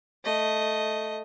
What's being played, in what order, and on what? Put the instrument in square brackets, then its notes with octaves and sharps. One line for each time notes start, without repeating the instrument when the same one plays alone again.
[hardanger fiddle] A3 D#5